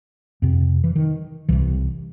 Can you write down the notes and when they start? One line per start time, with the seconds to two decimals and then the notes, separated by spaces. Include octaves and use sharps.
0.42 F2 C3
0.84 E3
0.96 D#3
1.49 C2 C3 E3